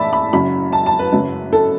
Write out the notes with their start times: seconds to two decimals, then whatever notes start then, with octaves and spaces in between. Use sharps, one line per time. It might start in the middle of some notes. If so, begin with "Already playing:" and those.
Already playing: A2 E3 D5 E5 A5 B5
0.13 B5
0.33 F#1 F#2 F#3 B5
0.73 A5
0.86 A5
0.99 B4
1.13 F#1 F#2 F#3
1.53 A4